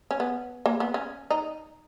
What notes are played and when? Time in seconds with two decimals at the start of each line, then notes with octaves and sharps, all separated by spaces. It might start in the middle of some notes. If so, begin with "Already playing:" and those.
0.11 C#4
0.20 B3
0.66 A#3
0.80 B3
0.94 C#4
1.31 D#4